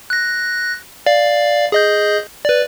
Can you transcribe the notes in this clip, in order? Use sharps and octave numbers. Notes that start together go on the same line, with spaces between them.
F#6 A#6
D5 F5
G#4 D#5 G6
B4 D5